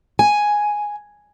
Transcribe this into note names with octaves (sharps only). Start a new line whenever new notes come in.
G#5